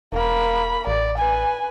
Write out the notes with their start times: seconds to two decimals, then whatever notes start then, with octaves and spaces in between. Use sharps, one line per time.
0.12 E1 A#3 B5
0.87 A1 D5
1.18 B4 G#5